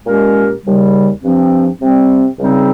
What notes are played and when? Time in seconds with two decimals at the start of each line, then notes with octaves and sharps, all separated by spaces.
0.05 A#2 G#3 C#4 G4 A#4
0.63 D#2 C#3 G3
1.21 G2 F3 C4
1.80 C3 G3 C4
2.37 C#2 C#3 G3 C4 D#4